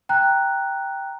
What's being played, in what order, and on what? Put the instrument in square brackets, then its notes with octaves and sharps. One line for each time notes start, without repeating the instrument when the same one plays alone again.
[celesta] G5 A#5 F#6